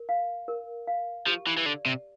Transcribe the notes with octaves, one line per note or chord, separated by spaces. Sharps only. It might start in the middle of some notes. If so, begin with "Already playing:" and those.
Already playing: A#4
F5
A#4
F5
F3 G4
E3
E3
D3 D5
C3